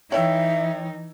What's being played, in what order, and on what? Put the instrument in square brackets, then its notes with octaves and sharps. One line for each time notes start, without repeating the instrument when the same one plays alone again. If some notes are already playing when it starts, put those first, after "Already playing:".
[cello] E3 D#4 [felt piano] C#5 G5 E6 [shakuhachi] E5